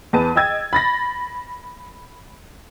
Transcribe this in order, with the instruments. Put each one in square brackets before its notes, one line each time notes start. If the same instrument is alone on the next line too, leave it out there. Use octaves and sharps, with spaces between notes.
[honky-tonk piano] E2 B4 A5 D#7
D#5 G5 E6 G#6 A6
B5 A6 A#6